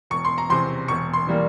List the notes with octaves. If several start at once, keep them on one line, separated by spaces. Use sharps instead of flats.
E1 C#6
C6
A#5
E2 C3 C6
E1 C#6
C6
E3 G3 A#3